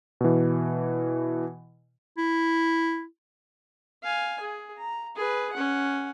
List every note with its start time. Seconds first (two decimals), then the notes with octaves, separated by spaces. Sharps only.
0.21 B2 E3
2.17 E4
4.03 F5 G#5
4.40 G#4
4.78 A#5
5.16 G#4 B4
5.53 C#4 F#5